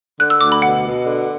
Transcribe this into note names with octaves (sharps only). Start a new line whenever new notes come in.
D3 F#6
E6
D2 D6
B5
B2 F#5
B2
D3